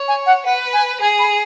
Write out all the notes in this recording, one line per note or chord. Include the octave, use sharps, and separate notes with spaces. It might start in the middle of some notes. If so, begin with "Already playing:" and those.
Already playing: C#5
G#5
F#5
B4 F#5
G#5
G#4 G#5
B5